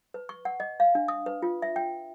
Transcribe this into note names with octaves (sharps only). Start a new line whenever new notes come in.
B4
C#6
F#5
D#5
F5
D4
D#6
B4
F4
E5
G5